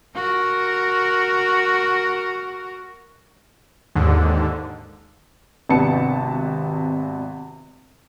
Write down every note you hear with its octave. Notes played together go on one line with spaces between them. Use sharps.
F#4 A#4
D#2 G#2 D3
G#1 C3 B3 D4 A5 C#7